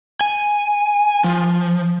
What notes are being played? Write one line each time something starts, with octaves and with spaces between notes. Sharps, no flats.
G#5
F3